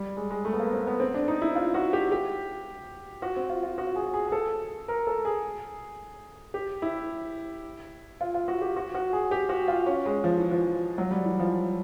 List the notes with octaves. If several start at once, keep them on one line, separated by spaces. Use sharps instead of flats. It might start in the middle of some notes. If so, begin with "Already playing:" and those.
Already playing: G3
G#3
G#3
A3
B3
A#3
C4
B3
C4
D4
D#4
E4
F4
F#4
G4
G4
F#4
C4
F4
F4
F#4
G#4
G#4
G#4
A4
A#4
A4
G#4
G4
E4
F4
F4
F#4
G4
F#4
F#4
G#4
G4
F#4
F4
C#4
G#3
F3
E3
F3
F#3
G3
E3
F3